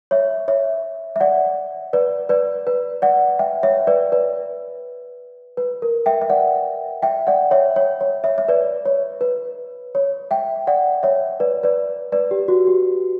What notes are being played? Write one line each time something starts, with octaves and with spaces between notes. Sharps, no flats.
C#5 E5
C#5 E5
E5
D5 F#5
B4 D5
B4 D5
B4
D5 F#5
E5 G5
C#5 E5
B4 D5
B4 D5
B4
A#4
E5 G5
E5
D5 F#5
E5 G5
D5 F#5
C#5 E5
C#5
C#5
C#5 E5
E5
B4 D5
C#5
B4
C#5
E5 G5
D5 F#5
C#5 E5
B4 D5
B4 D5
B4 D5
G4
F#4
G4